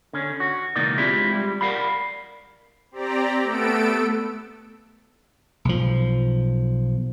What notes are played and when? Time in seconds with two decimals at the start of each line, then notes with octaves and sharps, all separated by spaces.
0.13 D3 C#4
0.40 F#4
0.76 C#2 B2 E3 A#3 D#4 D5
0.98 G#3 C4 D4 E4 F4 G4
1.35 G3
1.61 A#4 D5 F5 F#5 B5
2.91 C4 G4 D5 A#5
3.43 A3 B3 A4 E6 D7
5.65 B1 F3